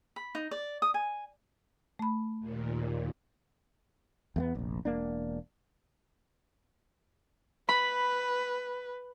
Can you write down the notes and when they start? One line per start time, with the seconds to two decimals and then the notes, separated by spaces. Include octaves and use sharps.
0.16 B5
0.35 D#4
0.51 D5
0.82 D#6
0.94 G#5
1.99 A3 B5
2.40 D#2 A#2
4.36 E2 A3 B3
4.55 F1 A#1
4.85 E1 A#3 D4
7.69 B4 B5